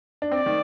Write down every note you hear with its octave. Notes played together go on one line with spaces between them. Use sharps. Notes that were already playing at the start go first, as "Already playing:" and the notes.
D4
C4 D5
D#3